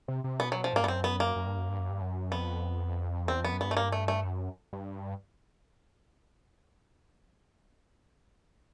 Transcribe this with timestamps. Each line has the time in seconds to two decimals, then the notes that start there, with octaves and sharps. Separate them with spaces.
0.08 C3
0.24 C3
0.40 B2 B3
0.52 F#3
0.64 F3
0.73 G#2
0.76 A#3
0.81 G2
0.84 B3
0.88 F#2 C4
1.04 B3
1.20 A#3
1.36 F#2
1.47 G2
1.57 F#2
1.69 G2
1.79 F#2
1.90 G2
2.01 F#2
2.32 F2 B3
3.28 E2 C4
3.40 F2 B3
3.52 F#2
3.61 G2 B3
3.71 A3
3.77 A#3
3.92 A3
4.08 A3
4.24 F#2
4.73 G2